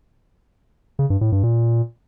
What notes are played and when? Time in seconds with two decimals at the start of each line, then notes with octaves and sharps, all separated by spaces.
0.99 C#3
1.10 G2
1.21 A2
1.32 G2
1.43 A#2